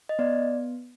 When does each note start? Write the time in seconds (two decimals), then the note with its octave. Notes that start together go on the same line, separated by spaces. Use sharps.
0.09 D#5
0.19 B3 D5